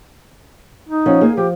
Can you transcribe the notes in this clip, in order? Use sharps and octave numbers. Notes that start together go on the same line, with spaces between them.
D#4
F3 C#4 F#5
A#3 G#4
F3 G4